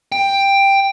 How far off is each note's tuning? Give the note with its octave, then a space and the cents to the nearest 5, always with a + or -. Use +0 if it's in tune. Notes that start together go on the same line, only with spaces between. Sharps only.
G5 +10